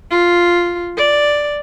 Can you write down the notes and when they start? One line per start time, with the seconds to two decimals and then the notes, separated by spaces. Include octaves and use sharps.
0.11 F4
0.97 D5